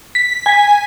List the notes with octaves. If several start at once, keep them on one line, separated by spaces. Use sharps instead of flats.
B6
G#5 B6